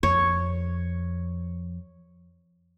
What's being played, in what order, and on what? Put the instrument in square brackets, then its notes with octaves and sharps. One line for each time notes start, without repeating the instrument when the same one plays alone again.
[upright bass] F2 [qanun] C#5